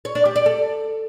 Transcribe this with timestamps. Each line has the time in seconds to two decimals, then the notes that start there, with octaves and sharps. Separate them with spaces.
0.05 C#5
0.15 D4
0.25 G4
0.36 D5
0.46 A4